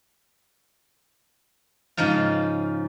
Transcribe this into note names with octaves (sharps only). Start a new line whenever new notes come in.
G#2 C#3 F3 D#4 F4